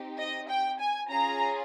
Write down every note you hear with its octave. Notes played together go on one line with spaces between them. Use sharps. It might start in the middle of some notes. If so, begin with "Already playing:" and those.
Already playing: C4 D#4 G4
D#5
G5
G#5
C#4 F4 G#4 A#5